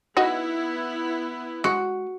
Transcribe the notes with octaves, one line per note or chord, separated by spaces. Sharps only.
B3 D#4 E4 F#4 D#5
G#3 F#4